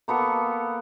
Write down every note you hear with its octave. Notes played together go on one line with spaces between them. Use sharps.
A#3 B3 A4 C#6